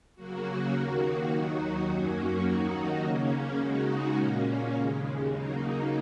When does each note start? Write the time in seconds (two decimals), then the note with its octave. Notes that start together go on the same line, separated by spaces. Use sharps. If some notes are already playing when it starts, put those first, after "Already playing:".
0.15 C#3 F#3 A#3 F#4
0.72 D#2 D#3 A#3 F#4
1.30 D#2 D#3 F#3 D#4 F#4
1.87 F#2 F#3 A#3 C#4 F#4
2.44 D#2 D#3 F#3 D#4 F#4
3.02 C#3 A#3 C#4
3.59 C#3 G#3 D#4 F#4
4.16 A#2 A#3 C#4
4.74 D#2 C#3 G#3
5.31 C#3 F#3 A#3 D#4